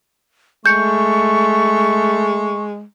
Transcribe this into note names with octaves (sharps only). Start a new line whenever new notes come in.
G#3 A3 C#6 G6 C#7